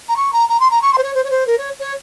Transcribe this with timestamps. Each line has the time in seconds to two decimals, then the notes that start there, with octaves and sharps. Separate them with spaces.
0.08 A#5
0.16 C#6
0.32 A#5
0.49 A#5
0.60 C6
0.70 A#5
0.81 C#6
0.93 C6
0.98 C5
1.03 C#5
1.14 C5
1.24 C#5
1.30 C5
1.47 A#4
1.58 C#5
1.79 C#5